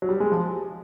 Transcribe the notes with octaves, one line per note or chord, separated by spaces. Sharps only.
F#3
G3
G#3
F3